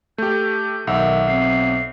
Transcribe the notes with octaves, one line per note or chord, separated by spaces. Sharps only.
A3 G4 G6
B1 D#3 E5 F#5 E6
C4 C7